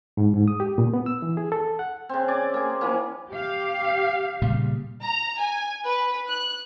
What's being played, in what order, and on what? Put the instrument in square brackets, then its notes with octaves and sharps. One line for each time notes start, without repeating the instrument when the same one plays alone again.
[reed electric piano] G#2
G#2
D#6
G4
A#2
B3
E6
E3
G#4
A4
F#5
[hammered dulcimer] C#3 C4
D5 G#5
A#3 G#4
E3 F3 A#3 C#4
[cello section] G4 F5
[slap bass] A#2 C#3 G3
[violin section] A#5
G#5
B4
F#6